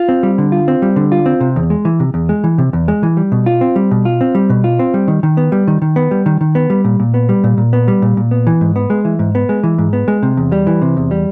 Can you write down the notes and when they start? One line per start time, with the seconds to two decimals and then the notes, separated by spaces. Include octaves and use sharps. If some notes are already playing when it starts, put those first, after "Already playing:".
Already playing: F4
0.09 C4
0.23 G3
0.38 D3
0.52 F4
0.68 C4
0.82 G3
0.96 D3
1.12 F4
1.26 C4
1.41 C3
1.56 E2
1.70 G#3
1.85 E3
2.00 C3
2.14 E2
2.29 G#3
2.44 E3
2.58 C3
2.73 E2
2.88 G#3
3.03 E3
3.17 G3
3.32 B2
3.46 F4
3.61 C4
3.76 G3
3.91 B2
4.05 F4
4.21 C4
4.35 G3
4.50 B2
4.64 F4
4.79 C4
4.94 G3
5.08 D#3
5.23 D#3
5.37 B3
5.52 G3
5.68 D#3
5.82 D#3
5.96 B3
6.11 G3
6.26 D#3
6.41 D#3
6.55 B3
6.70 G3
6.85 A#2
7.00 A#2
7.14 B3
7.29 G3
7.44 A#2
7.58 A#2
7.73 B3
7.88 G3
8.02 A#2
8.17 A#2
8.31 B3
8.47 E3
8.61 G#2
8.76 B3
8.90 G#3
9.05 E3
9.19 G#2
9.35 B3
9.49 G#3
9.63 E3
9.78 G#2
9.93 B3
10.08 G#3
10.23 C3
10.37 E2
10.52 G3
10.67 E3
10.82 C3
10.97 E2
11.11 G3